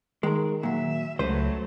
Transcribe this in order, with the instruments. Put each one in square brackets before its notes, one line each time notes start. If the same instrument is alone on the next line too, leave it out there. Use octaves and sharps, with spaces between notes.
[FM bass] D#3 [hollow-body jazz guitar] G#3 A#4
[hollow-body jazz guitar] A#2 F#3 [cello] E5
[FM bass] C#2 [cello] F#3 A3 [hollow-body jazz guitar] B4 C5